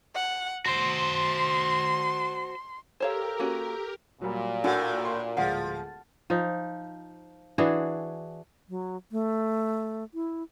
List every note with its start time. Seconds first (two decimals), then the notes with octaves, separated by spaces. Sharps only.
0.15 F#5
0.66 F#4 C5 C6
3.00 G4 A4 A#4 C5 C#5 F5 A#5 E6
3.39 A#3 C#4 F#4
4.21 A#2 F#3 G3
4.64 A2 D4 F#4 A4 F#5
5.05 C6
5.37 D1 F3 G#3 F4 F#5
6.30 F3 D#4
7.58 E3 D4 F#4 G#4
8.69 F#3
9.12 A3
10.14 E4